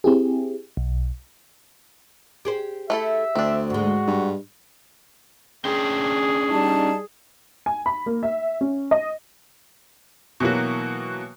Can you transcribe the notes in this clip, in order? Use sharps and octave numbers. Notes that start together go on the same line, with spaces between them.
C4 E4 G4 G#4
B1
G4 G#4 C5
A3 E4 A4 E5
D2 C4 D4
G#2 G#3 F#4
G2
C#4 D4 G#4 G5
G3 D#4 A5
G#5
B5
A#3
E5
C#4
D#5
B2 E3 F#3 A#3 F#4